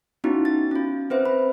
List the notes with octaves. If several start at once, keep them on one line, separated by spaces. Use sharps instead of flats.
B3 C#4 D#4 E4 F#4
A6
C#4 F4
C4 B4 C5 E5
B5